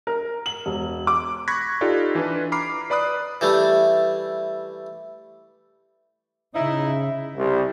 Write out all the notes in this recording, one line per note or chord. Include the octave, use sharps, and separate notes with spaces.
A#4
F#7
E1
D6
B5 C#6 F#6 G#6 A#6 B6
D#4 F4 G4 A4 D5
E3 D4 B4
A#5 B5 D6 F6 C7
B4 D5 B5 D#6 F#6
E3 G3 A3
C#3 D#4 E4
C2